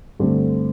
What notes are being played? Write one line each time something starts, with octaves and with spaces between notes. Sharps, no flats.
G2 D3 A3 C4